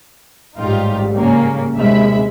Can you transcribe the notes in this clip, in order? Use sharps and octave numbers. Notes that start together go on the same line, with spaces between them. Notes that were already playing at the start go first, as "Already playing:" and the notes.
A1 G#2 G3 D#4 F4 G4
C#3 A#3 C#4
D#2 C3 G#3 E5 B5